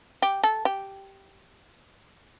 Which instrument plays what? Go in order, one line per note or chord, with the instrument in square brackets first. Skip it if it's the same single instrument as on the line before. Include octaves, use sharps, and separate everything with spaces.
[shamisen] G4
A4
G4